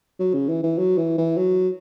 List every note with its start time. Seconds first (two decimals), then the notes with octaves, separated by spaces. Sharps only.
0.19 F#3
0.34 C#3
0.49 E3
0.63 E3
0.78 F#3
0.98 E3
1.18 E3
1.37 F#3